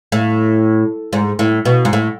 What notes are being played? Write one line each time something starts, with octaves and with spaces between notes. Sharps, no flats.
A2
G#2
A2
B2
G#2
A2